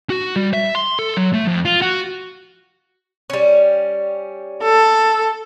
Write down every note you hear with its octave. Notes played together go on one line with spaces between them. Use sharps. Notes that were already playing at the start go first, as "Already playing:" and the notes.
F#4
G3
E5
C6
A4
F#3
A3
F2
F4
F#4
G3 C#4
A4